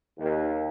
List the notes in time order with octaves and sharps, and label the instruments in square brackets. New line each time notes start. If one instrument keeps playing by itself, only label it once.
[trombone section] D#2